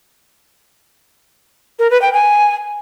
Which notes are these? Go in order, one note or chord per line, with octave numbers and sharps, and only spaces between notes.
A#4
B4
G5
G#5